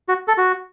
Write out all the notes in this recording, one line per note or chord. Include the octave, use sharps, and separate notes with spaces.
F#4
A4
F#4